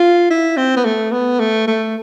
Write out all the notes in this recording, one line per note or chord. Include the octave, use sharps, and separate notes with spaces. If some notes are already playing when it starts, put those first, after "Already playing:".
Already playing: F4
E4
C4
B3
A3
B3
A3
A3